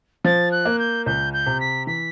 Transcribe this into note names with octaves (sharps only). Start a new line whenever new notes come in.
F3 A6
F#6
A#3
G6
C#2 G6
G6
C3
B6
E3 B6